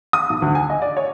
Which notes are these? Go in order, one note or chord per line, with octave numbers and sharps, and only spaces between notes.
D#6
B1
D2
G#5
D#5
D5
C#5